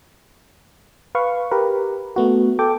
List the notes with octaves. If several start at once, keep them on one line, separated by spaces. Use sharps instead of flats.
B4 F5 C#6
G4 A#4 B4
A3 B3 F#4
A4 G5 D6